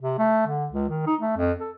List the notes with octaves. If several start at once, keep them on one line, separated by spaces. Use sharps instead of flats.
C3
A3
D3
C#2
D#3
D#4
A3
F2
A4